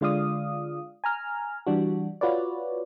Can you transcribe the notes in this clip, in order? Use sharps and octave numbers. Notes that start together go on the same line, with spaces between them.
D3 G#3 F4 D5 F5 D#6
G#5 A#5 F6
E3 G3 D4 F#4
F4 F#4 B4 C#5 D5